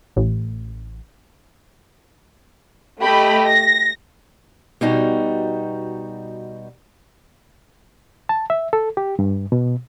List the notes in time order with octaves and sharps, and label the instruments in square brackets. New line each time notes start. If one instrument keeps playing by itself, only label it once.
[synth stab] A1
[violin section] A3 G4 D#5 B5
A#6
[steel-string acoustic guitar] B2 G3 D#4 F#4
[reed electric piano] A5
E5
A4
G4
G2
B2